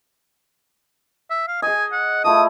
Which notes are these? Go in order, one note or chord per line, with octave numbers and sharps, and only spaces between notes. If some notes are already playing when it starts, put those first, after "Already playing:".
E5
F5
G#4 D#5 G#5
F#5
F3 A3 E4 D#6